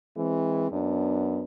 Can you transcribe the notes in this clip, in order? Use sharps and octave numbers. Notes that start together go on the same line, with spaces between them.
E3 G#3 C4
F#2 B3 D4